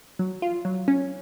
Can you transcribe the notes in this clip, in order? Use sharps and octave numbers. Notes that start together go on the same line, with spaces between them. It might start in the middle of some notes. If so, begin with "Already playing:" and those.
F#3
F4
F#3
C#4